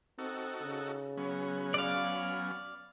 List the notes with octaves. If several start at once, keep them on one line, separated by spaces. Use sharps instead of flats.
C4 D#4 F#4 A4
C#3
F#3 B3 C#4
D5 F5